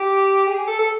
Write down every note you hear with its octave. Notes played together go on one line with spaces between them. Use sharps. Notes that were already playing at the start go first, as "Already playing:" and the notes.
Already playing: G4
G#4
A4
A4